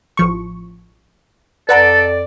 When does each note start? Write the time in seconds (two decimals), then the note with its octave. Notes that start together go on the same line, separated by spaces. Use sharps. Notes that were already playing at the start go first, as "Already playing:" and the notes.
0.17 A1 F3 C#6
1.69 F2 A4 B4 D5 F#5 A#5